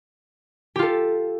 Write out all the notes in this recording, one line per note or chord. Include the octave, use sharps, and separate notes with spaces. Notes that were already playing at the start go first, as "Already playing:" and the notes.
F4 G4 A4